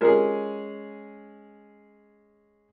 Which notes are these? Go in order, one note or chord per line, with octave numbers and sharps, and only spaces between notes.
G#3 C#4 F4 G4 G#4 A#4